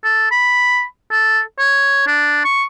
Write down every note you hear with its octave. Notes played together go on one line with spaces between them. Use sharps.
A4
B5
A4
C#5
D4
C#6